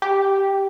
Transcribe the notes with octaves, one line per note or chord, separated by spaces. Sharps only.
G4